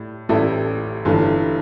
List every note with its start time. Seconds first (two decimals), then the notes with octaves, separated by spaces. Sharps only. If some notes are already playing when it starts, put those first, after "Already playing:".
Already playing: A2 G3
0.29 A1 A2 G3 E4 A4
1.05 G1 G2 E3 A3